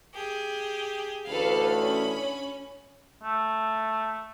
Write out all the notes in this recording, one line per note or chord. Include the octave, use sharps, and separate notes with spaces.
G4 G#4
A1 D2 A4 B4 F5 B5
C#4
A3